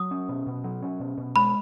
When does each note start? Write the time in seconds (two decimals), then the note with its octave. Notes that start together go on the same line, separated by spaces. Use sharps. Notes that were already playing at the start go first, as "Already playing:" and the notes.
Already playing: F#3 D#6
0.11 C#4
0.29 B2
0.47 B2
0.64 F#3
0.82 C#4
1.00 B2
1.18 B2
1.36 G#3 B5